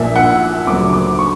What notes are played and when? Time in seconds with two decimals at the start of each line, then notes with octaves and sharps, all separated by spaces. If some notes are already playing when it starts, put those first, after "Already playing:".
Already playing: A#1 A#2 A#3 D4 E5
0.16 F#5
0.67 D2 C#3 F#3 A#3 D4 D6
0.93 D6
1.19 C#6